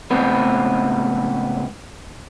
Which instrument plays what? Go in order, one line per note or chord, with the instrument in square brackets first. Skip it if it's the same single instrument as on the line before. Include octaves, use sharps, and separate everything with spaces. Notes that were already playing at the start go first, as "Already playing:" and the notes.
[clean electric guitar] C#2 A2 B3 C4 B4